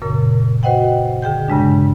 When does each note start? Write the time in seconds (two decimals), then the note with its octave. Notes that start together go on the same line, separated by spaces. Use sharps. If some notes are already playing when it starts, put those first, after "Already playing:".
0.02 F#2 A#2 C#3 A#4
0.63 F#4 B4 C5 D#5 F#5 G5
1.22 D3 G#4 G5 G6
1.48 G2 C#3 G#3 D4